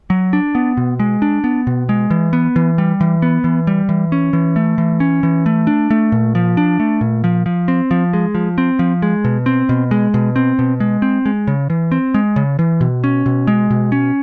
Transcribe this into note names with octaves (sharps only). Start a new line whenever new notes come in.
F#3
D4
B3
B2
G#3
D4
B3
B2
G#3
E3
B3
E3
G3
E3
B3
E3
G3
E3
C#4
E3
A3
E3
C#4
E3
A3
D4
A3
A#2
F3
D4
A3
A#2
F3
F3
C4
F3
G#3
F3
C4
F3
G#3
B2
C4
B2
G#3
B2
C4
B2
G#3
C4
G#3
C#3
E3
C4
G#3
C#3
E3
B2
C#4
B2
G#3
B2
C#4